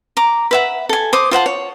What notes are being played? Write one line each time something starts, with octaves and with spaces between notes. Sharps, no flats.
A#5 D6
B4 E5 F#5
A4 G#5
C5 D6 D#6
F4 C5 F#5 A5
C#5